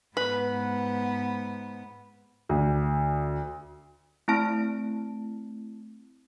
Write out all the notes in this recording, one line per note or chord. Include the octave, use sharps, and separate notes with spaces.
G#2 B3 B4
D2
A3 C4 E4 A5 D7